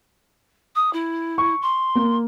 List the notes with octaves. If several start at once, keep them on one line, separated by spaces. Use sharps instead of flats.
D#6
E4
C#6
C6
A#3